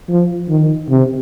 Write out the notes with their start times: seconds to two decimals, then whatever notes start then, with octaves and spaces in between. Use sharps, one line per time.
0.09 F3
0.49 D#3
0.90 C3